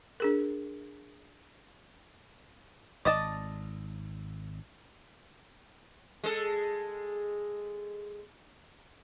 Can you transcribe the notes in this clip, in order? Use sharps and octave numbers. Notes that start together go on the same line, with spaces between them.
D4 G#4 A#4
G#1 D5 D#5 A5
G#3 A4